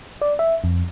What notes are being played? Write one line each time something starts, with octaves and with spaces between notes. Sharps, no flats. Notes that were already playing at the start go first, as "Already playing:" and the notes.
D5
E5
F2